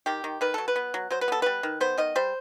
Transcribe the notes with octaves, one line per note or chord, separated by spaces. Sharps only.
D#3 G4
D#3
D#3 B4
F#3 A4
B4
B3
F#3
F#3 C5
B4
B3 A4
G3 B4
D#3
B3 C5
D#3 D#5
G3 C5